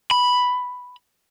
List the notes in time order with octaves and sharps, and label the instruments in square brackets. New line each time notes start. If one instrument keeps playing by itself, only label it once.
[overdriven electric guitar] B5